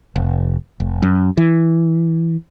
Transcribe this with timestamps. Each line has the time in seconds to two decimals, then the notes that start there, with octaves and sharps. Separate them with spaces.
0.16 F1
0.80 F1
1.02 F#2
1.37 E3